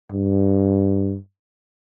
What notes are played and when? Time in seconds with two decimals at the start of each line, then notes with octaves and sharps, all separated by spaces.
0.12 G2